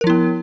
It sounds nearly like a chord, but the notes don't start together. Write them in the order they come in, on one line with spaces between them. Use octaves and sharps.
A#4 F3 E4 B3